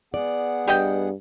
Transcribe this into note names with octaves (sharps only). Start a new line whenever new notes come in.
B3 G#4 D5 F#5
G2 G4 D#5 G5